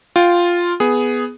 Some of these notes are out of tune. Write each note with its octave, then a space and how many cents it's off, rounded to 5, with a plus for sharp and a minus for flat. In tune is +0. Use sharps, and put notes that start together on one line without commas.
F4 +0 G5 -10
B3 +0 G#4 +5